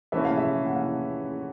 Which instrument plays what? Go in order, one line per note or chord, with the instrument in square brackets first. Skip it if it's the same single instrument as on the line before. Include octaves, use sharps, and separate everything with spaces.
[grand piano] E3 A3 C#4 [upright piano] E5
[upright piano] F5
E5
F#5
F5